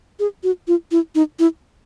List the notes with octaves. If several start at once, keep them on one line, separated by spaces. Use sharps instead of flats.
G#4
F#4
F4
E4
D#4
E4